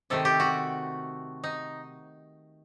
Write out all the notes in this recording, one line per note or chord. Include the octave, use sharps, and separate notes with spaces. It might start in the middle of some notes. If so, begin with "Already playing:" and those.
C3 D#3 A3 A4
G4
F#4
D#4